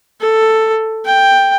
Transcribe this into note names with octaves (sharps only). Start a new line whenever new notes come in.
A4
G5